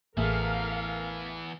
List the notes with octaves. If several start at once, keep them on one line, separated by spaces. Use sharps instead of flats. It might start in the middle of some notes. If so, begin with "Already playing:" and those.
A1 E3 A3 B3 G#4 A#4 F5